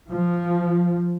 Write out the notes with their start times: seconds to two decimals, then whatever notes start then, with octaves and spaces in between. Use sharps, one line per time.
0.10 F3